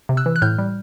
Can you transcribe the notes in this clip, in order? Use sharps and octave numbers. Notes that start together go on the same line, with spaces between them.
C3
E6 F#6
E3
F#6
A2 F6 G6
G3